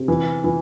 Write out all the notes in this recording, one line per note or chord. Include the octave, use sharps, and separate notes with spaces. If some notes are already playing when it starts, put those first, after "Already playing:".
Already playing: C3
E3
E3